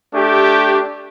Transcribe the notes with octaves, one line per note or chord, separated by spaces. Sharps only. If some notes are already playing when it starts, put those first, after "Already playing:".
A3 D4 G4